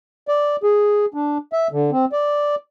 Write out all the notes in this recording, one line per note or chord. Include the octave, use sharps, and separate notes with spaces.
D5
G#4
D4
E5
D3
C4
D5